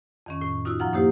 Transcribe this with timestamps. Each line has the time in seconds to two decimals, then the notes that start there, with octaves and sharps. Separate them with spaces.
0.26 F2 D#3 C#4
0.41 A2
0.65 D#4 F4 F#4 E6
0.79 F#2 F3 F#5 F6
0.93 A#3 D#4 E4 G4 C5